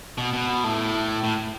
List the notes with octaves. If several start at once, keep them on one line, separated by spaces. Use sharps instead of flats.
B2
B2
A2
A2